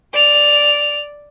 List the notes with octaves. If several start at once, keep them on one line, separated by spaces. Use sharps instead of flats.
D5 F7